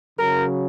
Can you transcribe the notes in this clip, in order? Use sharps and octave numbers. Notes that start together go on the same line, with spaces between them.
C#3 F#3 A#4